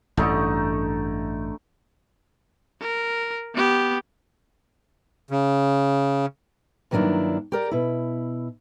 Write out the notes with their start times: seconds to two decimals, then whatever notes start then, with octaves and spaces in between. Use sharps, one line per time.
0.17 A1 G2 D3 A3 D#4
2.81 A#4
3.55 B3 G4
5.31 C#3
6.91 G2 D#3 F#3 A#3 D4 E4
7.52 G4 A#4 D5
7.71 B2 E4